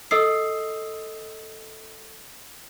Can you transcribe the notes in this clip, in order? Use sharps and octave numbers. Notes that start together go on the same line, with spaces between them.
A4 D#5 D#6 E6 C7